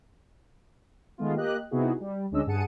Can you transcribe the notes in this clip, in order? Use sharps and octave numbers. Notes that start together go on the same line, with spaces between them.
D#3 G#3 A3 B3 F4
A#3 G4 D#5 F#6
C3 B3 D#4 E4 F#4 G#4
G3
D2 G#3 C#4 D4 D#5 E6
G2 G#4 F#5 A5 C#7 D#7